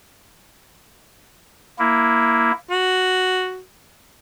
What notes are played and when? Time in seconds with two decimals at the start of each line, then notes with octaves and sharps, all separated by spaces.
1.79 A#3 E4
2.70 F#4